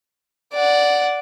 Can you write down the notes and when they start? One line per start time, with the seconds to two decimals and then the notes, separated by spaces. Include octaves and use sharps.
0.53 D5 F#5